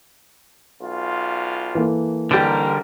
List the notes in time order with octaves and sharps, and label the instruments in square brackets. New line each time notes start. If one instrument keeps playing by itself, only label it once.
[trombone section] B1 F4
[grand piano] E3 A#3 A4
[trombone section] G#2 A#4 [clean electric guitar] D3 G3 [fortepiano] G4 B4